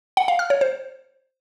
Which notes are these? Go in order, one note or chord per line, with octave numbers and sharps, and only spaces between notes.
F#5
F5
F6
C#5
C5